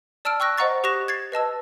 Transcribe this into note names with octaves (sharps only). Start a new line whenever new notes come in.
D5 A5 E6 F6 D7
G5 C#6 E6 F#6 A#6
C5 D#5 F#5 A#5 C#6 A6
G4 C#6 D#6 F#6 A#6 E7
G#6 A6 C7
B4 D#5 A5 E6